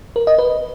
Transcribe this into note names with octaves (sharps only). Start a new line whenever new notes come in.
A#4
D#5
B4